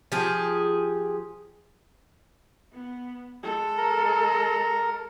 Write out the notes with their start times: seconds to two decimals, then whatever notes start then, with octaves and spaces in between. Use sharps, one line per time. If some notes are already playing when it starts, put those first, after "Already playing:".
0.12 F3 G4 G#4
2.73 B3
3.43 G#3 A4
3.78 A#4 A#5